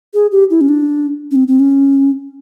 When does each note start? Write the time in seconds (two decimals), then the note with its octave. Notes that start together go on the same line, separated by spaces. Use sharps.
0.14 G#4
0.32 G4
0.50 E4
0.61 C#4
0.69 D4
1.31 C#4
1.36 C4
1.48 C4
1.60 C#4